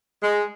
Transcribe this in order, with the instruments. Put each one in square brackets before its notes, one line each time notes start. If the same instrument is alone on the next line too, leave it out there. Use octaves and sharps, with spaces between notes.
[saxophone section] G#3